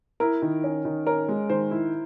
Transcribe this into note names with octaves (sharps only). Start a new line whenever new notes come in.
E4 A#4
D#3
C#4
D#3
C#4 A#4
G#3
D#3 C5
E4